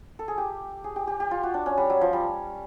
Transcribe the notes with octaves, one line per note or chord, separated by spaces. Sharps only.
A4
G#4
G4
G#4
G4
G4
G4
F4
F#4
D4
C#4
G3
F#3
F3
G3